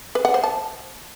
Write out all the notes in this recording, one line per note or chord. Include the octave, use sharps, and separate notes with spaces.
B4
F#5
C5
A5